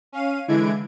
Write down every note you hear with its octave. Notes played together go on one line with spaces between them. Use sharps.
C#4 F5 D#7
D3 E3 G#3 E4 G#6 D7